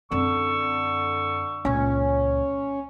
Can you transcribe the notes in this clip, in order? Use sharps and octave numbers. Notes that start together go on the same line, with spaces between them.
F#2 D3 C4 C#6 E6
C#2 A#2 C#4